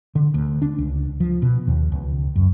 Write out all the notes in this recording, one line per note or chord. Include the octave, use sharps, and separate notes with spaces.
D3
D2
D4
C#2
F3
B2
D#2
C#2
F#2